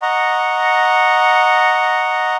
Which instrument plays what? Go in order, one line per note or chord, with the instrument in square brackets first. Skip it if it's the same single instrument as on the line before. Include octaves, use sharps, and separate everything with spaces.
[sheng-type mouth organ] D#5 F#5 A#5 C#6